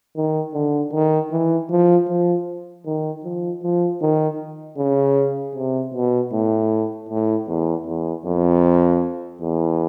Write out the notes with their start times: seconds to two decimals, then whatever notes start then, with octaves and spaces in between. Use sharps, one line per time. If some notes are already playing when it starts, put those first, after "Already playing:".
0.16 D#3
0.54 D3
0.93 D#3
1.31 E3
1.70 F3
2.08 F3
2.86 D#3
3.24 F3
3.63 F3
4.01 D#3
4.78 C#3
5.55 C3
5.94 B2
6.32 A2
7.09 A2
7.48 E2
7.87 E2
8.25 F2
9.41 E2